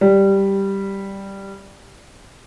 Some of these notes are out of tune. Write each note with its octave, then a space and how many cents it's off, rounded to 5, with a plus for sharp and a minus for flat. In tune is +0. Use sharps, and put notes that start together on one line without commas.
G3 +0